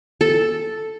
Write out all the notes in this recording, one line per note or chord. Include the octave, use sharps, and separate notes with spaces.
A4